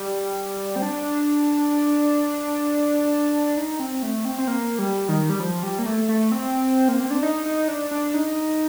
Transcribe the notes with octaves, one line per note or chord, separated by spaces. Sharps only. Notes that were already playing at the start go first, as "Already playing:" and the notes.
Already playing: G3
C4
D4
D#4
C4
A3
C4
C4
A#3
G3
D#3
G3
F3
G3
A#3
A3
A3
C4
A#3
C4
D4
D#4
D#4
D4
D4
D#4